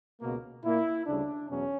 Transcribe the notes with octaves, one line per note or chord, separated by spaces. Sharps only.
C#2 B2 A#3
A#2 A#3 E4
D2 C#3 G3 D4
E2 B2 F#3 C#4